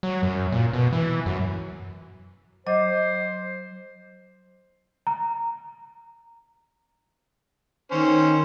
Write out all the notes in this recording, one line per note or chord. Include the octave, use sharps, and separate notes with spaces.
F#3
F#2
A#2
B2
E3
F#2
F#3 C5 D#5 D6
A#5
D#3 C#4 C5